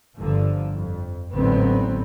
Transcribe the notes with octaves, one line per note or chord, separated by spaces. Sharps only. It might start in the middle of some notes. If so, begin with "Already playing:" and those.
G1 G2 D3 F3
F2
A1 G#2 D3 F#3 B3 C4